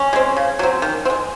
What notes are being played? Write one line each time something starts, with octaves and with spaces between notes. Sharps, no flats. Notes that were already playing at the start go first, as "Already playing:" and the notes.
Already playing: C#4
G#3 C4
C#3
F#3 C4
D#3
C4
G#3